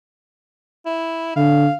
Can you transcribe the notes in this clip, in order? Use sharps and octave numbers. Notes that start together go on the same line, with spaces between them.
E4
D3 F5